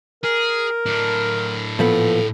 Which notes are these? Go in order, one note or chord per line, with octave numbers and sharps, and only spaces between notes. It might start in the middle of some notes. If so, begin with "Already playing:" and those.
G#4 A#4
A2 D4
A#2 F3 B3 A4